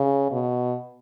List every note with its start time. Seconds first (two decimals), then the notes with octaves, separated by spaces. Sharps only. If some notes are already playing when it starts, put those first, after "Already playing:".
Already playing: C#3
0.31 B2